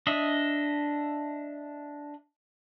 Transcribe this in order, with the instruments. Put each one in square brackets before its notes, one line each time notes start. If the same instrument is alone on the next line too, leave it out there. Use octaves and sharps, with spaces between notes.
[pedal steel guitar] D4 D#5 E5